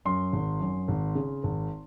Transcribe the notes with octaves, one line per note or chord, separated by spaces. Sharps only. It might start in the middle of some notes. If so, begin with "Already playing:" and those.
F#2 C6
G#1
F#2
G#1
C#3
G#1